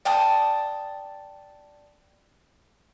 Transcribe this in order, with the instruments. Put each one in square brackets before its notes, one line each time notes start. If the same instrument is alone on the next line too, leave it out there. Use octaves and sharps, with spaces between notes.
[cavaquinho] D5 G5 A5 D#6